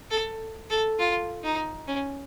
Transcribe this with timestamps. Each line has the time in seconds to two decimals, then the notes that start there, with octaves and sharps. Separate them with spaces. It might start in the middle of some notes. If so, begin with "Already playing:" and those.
0.10 A4
0.70 A4
0.99 F4
1.43 D#4
1.88 C#4